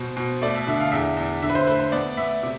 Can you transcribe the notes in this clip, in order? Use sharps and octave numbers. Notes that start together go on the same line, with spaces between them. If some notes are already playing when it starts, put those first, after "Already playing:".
Already playing: B2 C5
B2
A3 D5
E5
D3 E5
F5
E2 E5
E2
D3 E5
B4
C5
A3 B4
C5
B3 D5
B3 E5
C3